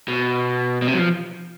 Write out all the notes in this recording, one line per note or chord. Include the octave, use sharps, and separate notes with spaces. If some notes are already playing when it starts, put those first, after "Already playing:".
B2
B2
C3
F#3
F3